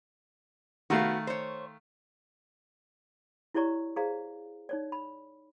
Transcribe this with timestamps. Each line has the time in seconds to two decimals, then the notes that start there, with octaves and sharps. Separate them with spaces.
0.90 D#3 A3 B3 F#4 F5
1.27 C5 C#5
3.55 E4 G4 C#5 D5 A#5 C#6
3.96 G#4 C5 D5 F5 A#5
4.69 D#4 C#5 D5
4.92 B5